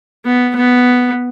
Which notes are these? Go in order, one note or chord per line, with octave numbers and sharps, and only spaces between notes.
B3
B3